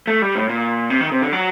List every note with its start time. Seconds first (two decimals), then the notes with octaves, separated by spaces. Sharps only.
0.07 A3
0.22 G3
0.35 A2
0.49 A#2
0.90 C3
1.01 D#3
1.12 C3
1.22 D3
1.32 F#3